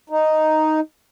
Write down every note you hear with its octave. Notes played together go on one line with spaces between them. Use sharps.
D#4